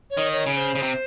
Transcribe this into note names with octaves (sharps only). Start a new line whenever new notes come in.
C#5
D#3
C#5
C#3
C#5
C5
C#3
C3